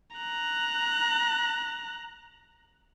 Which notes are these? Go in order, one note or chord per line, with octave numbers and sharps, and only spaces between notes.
A#5 F#6